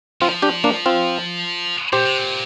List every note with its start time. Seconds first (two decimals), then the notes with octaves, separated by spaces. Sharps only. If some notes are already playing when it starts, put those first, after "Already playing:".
0.21 F3 C4 F4
0.42 D4 G4
0.64 A#3 D4
0.86 C4 F4
1.93 A#2 G4 C5
2.05 C3
2.18 A#2